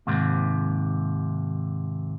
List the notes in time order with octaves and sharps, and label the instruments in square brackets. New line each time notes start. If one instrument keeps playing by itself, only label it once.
[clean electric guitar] D#2 G#2 C3